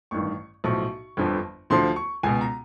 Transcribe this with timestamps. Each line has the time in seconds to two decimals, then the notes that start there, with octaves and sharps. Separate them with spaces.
0.11 A1 G2 D#3 C#6
0.64 B1 A2 F3 C#6
1.17 G1 F2 D3 F3
1.70 D2 D3 F3 C6
1.96 C#6
2.23 C#2 B2 G#5
2.41 A#5